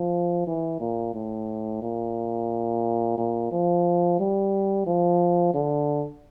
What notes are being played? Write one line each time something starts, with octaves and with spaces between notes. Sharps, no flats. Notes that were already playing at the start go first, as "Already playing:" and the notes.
Already playing: F3
E3
A#2
A2
A#2
A#2
F3
G3
F3
D3